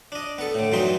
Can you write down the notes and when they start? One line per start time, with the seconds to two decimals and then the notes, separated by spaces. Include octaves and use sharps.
0.12 D4 D#5
0.38 B3 A4
0.54 A2 D3
0.72 G2 E3 F#3 C4 D#4 C6